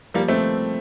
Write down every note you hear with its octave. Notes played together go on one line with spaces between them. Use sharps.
F3 G3 A#3
A3 C4